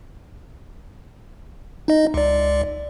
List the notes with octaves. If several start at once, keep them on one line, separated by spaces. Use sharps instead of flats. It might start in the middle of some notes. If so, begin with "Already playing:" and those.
D#4 D#5
C#2 D5